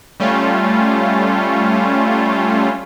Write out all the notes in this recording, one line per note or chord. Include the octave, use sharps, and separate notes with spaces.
G3 A3 C#4 F4